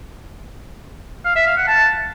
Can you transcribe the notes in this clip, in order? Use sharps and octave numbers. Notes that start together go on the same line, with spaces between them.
F5
E5
F5
F#5
A5